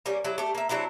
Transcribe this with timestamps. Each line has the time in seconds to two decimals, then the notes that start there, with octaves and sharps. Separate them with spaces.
0.06 G3 A#3 C#4
0.24 F#3 E4 G4
0.38 A3 G4
0.55 A#3 E5
0.69 F#3 C4 D4 E4